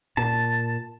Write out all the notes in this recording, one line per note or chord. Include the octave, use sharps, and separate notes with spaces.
A#2 A5